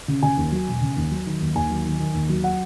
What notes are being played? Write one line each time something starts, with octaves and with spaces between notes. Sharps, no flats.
C#3
C#3 G#5
D#2
F#3
E1
C#3
D#2
F#3
D#3
D#2
D#2 G#5
F#3
D#3
D#3
D#2
F#3
F#5